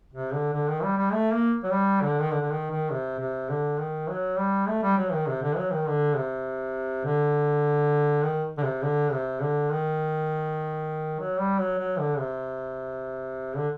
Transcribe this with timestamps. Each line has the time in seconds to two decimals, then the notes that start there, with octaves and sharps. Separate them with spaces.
0.14 C3
0.33 D3
0.53 D3
0.68 D#3
0.83 G3
0.97 G3
1.12 A3
1.32 A#3
1.63 F#3
1.71 G3
2.01 D3
2.20 D#3
2.31 D3
2.41 D3
2.51 D#3
2.70 D#3
2.90 C3
3.19 C3
3.49 D3
3.79 D#3
4.08 F#3
4.38 G3
4.68 A3
4.83 G3
4.98 F#3
5.12 D#3
5.27 C3
5.42 D3
5.57 F#3
5.72 D#3
5.87 D3
6.16 C3
7.05 D3
8.23 D#3
8.58 D3
8.63 C3
8.83 D3
9.12 C3
9.42 D3
9.71 D#3
11.20 F#3
11.40 G3
11.59 F#3
11.78 F#3
11.99 D3
12.18 C3
13.56 D3